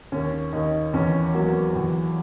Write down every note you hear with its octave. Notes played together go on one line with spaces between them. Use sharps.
D#2 C#4
D#2 D#4
E2 C#4
F#3 A#3
E2